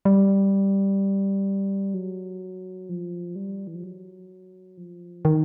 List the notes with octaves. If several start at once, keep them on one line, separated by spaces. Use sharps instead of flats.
G3
F#3
F3
G3
E3
F3
F#3
F3
D#3